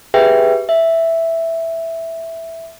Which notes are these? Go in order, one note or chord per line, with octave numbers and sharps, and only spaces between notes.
G4 G#4 B4 E5 G5
E5